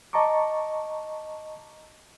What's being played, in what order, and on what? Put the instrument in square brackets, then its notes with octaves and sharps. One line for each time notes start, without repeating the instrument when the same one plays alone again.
[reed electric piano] D#5 A5 A#5 C#6 D6